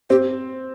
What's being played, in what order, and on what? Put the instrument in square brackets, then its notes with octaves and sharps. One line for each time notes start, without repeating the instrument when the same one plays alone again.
[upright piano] C4 [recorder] G4